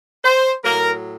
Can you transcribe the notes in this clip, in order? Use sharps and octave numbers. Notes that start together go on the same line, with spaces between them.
C5
A2 F#3 A#4